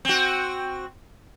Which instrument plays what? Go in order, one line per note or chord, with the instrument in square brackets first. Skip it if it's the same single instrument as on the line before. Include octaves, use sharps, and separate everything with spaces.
[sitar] C4 F#4